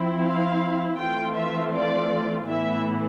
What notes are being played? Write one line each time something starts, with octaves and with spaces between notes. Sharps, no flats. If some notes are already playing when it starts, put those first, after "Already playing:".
Already playing: F3 C4 E4
F5
E3 A3 C4 F4 G5
E5
D5
A2 E3 B3 E4 E5